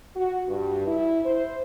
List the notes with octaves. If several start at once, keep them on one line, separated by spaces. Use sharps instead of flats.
F#4
G2
E4
C5